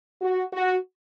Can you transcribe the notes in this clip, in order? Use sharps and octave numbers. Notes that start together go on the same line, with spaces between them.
F#4
F#4